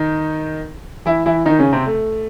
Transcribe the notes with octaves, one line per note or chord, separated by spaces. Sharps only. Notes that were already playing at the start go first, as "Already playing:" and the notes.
Already playing: D#3 D#4
E3 E4
E3 E4
D#3 D#4
C#3 C#4
C3 C4
A3